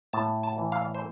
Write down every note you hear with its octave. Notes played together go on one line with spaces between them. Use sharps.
A2 A5
A5
E3
F5
C5